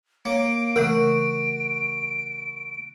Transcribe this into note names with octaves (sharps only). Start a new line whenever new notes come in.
A#3 C#5 D7
C#3 E3 A3 F#4 A#4